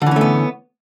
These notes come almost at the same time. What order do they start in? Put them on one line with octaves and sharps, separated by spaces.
D3 E3 C#4 A3 B3